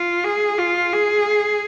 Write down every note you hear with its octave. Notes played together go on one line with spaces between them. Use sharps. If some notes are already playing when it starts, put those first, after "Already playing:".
Already playing: F4
G#4
F4
G#4